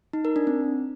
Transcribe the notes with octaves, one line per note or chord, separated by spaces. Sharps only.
D#4
A#4
D4
C4